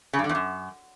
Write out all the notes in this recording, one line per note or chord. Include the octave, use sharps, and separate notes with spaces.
C#3
G2
D3
E2
F#2